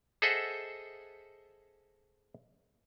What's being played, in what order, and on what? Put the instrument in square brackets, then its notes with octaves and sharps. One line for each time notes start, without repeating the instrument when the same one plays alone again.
[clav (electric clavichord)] G#4 A4 C5 D#5 E5 F#5